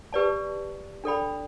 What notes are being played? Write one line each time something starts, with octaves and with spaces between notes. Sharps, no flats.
G4 B4 D5 A5
D4 A4 D5 G5 B5